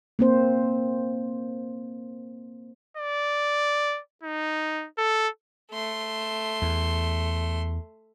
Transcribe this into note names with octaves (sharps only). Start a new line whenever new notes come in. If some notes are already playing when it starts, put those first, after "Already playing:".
A#3 C4 C5
D5
D#4
A4
A3 C6
E2